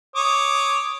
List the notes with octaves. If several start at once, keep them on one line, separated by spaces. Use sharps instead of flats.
C#5 D6 D#6